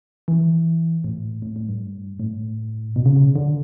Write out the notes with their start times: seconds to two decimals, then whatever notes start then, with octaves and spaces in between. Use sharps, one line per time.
0.28 E3
1.04 A2
1.42 A2
1.56 A2
1.69 G2
2.19 A2
2.96 B2
3.06 C#3
3.16 C#3
3.36 D3